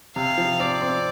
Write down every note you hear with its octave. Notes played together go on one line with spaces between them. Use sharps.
C3 F5
F3
C4 D5
C4